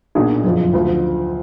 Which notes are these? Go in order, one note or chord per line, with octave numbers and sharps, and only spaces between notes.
B1 A#2 F#3 D4 G#4
F#1 F2 F3
D2 D3 F3